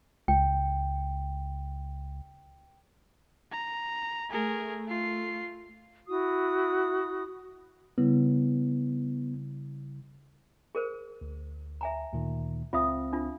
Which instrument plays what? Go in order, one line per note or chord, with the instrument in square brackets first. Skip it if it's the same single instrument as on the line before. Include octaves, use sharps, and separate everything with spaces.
[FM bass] C#2 [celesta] G5
[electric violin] A#5
[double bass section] A3 [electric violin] G#4 A#4
[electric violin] F4 C7
[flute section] E4 F#4 D#6
[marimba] C#3 G3 E4 [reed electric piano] B3
[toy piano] G#4 A#4 C5
[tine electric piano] D2
[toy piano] E5 G#5 A#5
[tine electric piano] D2 A#2 D#3
[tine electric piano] C#2 C4 F5 [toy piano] F4 E5 D#6
[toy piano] D4 F4